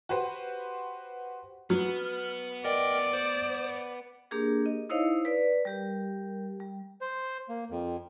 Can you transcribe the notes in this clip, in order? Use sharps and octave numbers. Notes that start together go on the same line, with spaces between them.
F#4 G4 B4 C5
F#3 B3 F6
A#4 D5 D#5 G5
C5
A#3 D4 G4 G#4 A#4
D#5
D#4 E4 C5 C#5 D#5 F5
B4 D5
G3 G4 A#4
G3
C5
A#3
F2